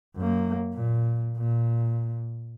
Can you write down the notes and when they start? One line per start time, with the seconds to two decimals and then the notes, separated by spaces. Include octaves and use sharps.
0.16 F#2 A#3
0.74 A#2
1.37 A#2